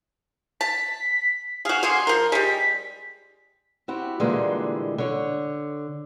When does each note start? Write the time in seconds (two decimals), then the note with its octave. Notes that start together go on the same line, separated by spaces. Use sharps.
0.61 A5 B6
1.65 F#4 G#4 F5
1.83 D3 F#4 G#4 C6
2.07 F3 A#4
2.32 G3 G#3 B6
3.88 C4 E4 F#4 G4
4.20 A#2 D3 E3 G3 G#3
4.98 D3 C#5